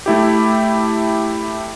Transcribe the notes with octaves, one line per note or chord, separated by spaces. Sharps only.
A3 E4 G4